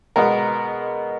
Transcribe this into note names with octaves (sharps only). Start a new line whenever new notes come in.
B2 G#3 B3 A#4